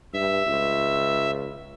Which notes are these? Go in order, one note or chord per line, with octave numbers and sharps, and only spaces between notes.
G2 E5
C#2